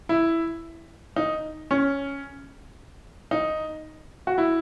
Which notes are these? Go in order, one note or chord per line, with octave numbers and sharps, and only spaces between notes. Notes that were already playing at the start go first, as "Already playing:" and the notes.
E4
D#4
C#4
D#4
F#4
E4